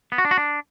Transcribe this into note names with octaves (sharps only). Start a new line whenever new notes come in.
B3
F#4
D4
F#4
D4